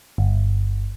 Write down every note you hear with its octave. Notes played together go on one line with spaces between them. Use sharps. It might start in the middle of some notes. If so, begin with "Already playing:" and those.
G1